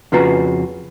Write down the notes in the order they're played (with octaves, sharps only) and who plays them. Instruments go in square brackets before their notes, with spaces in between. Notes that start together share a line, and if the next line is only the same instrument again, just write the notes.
[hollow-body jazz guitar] F2 C#3 F4 F#4 B4 A#5